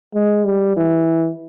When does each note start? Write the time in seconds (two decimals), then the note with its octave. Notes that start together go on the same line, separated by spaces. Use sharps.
0.15 G#3
0.45 G3
0.77 E3